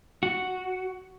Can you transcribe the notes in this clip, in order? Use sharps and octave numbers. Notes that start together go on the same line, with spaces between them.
F#4